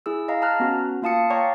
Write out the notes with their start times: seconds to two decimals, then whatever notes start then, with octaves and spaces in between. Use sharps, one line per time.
0.06 E4 G#4 E6
0.28 D#5 F5 A#5
0.42 A5 A#5 F6 F#6
0.60 B3 C#4 F#4
1.02 A#3 F4 F5 A5 D#6 C#7
1.30 C#5 D5 F5 G5 A#5 C#6